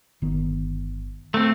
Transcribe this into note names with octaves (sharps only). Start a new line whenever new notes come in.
G1 D#3 B3
A3 C4